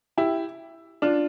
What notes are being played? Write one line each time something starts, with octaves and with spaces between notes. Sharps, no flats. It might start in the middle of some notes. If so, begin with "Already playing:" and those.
E4 G4
D4 F4